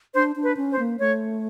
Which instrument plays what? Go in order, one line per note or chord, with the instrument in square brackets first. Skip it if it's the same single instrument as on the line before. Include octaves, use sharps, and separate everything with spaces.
[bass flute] D4 [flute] C5
[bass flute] D4
[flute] B4
[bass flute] C#4
[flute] C5
[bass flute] A#3
[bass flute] A3 [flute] C#5